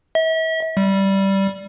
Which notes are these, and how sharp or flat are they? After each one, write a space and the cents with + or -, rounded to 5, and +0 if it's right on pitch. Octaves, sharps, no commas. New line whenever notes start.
E5 -40
G3 -10